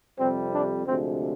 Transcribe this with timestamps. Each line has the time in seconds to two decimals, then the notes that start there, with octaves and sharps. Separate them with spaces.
0.19 F2 C3 G3 C4
0.53 D4
0.85 D2 C3 F3 G#3 C4